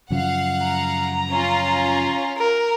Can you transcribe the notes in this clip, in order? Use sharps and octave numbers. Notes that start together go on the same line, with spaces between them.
F#2 C#3 F3 F5 F#5
A#5
C#4 F4
A#4